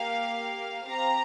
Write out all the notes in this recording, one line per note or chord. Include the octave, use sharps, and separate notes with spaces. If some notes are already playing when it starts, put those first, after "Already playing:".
Already playing: A#3 G4 F5
C4 G4 A#5